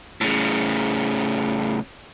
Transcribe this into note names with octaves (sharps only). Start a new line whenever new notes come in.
A2 C#3